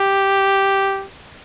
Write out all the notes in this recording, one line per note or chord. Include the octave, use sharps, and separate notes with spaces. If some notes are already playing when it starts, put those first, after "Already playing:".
Already playing: G4